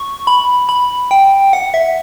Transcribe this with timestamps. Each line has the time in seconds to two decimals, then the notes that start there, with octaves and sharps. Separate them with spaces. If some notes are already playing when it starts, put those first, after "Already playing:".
Already playing: C#6
0.27 B5
0.69 B5
1.11 G5
1.53 F#5
1.74 E5